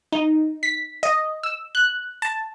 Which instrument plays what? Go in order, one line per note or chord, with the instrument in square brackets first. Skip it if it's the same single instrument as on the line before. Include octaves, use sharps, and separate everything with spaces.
[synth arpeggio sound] D#4
B6
D#5
E6
F#6
A5